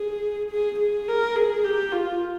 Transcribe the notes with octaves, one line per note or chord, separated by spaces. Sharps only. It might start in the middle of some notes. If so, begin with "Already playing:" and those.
Already playing: G#4
G#4
G#4
A#4
G#4
G4
F4